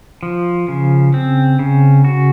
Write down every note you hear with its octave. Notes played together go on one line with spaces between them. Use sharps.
F3
C#3
C4
C#3
F#4